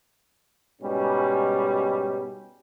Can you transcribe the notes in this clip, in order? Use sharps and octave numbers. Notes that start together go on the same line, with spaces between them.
G#2 B2 G3 C#4